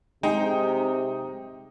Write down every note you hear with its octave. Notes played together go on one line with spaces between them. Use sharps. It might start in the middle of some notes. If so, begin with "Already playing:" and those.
C3 G#3 D#4 G5